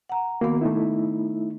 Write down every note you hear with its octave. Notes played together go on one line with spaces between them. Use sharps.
F#5 A#5
D#3 A#3 B3 F#4
A3 D#4 E4